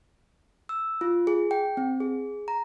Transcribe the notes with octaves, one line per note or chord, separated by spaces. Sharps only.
E6
F4
G#4
G5
C4
G#4
A#5